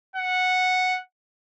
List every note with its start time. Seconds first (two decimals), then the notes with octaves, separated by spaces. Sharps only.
0.16 F#5